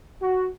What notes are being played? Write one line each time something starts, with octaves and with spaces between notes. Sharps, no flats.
F#4